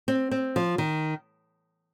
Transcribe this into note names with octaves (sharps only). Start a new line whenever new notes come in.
C4
C4
F3
D#3